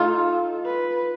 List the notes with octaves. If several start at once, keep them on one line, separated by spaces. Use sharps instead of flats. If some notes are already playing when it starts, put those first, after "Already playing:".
Already playing: D#4 F4 A4
B4